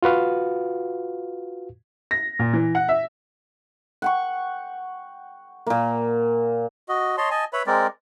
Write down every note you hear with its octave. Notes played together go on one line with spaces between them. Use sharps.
F4 F#4 B4 F5
A#6
A#2
E3
F#5
E5
F#5 G5 C#6
A#2 A#3
F#4 D#5
C#5 D#5 A5 C6
D#5 G#5 A5
B4 C#5 E5 B5
G#3 C4 A#4 D5